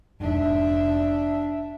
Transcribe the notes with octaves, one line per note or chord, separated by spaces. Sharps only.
F1 G#2 D4 E5